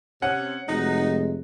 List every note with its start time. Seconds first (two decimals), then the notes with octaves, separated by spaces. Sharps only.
0.22 C3 C#4 F#5
0.69 F1 G#3 D#4 F#4